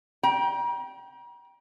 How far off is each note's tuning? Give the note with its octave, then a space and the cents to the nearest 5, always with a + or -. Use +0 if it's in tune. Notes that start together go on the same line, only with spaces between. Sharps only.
G5 +0 A#5 +40